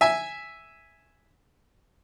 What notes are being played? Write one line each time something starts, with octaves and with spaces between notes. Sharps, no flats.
E5 G#5